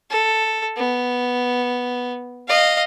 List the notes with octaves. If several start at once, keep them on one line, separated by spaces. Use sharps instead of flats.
A4
B3
D#5 F5